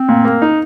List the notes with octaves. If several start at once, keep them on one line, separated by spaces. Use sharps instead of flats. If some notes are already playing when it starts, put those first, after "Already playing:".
Already playing: C4
A#2
A#3
D#4